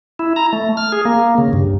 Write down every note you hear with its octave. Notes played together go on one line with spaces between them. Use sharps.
E4
A#5
A3
F6
G#4
A#3
C#3
G2